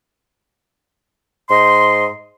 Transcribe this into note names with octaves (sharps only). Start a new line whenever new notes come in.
G#2 D#5 C6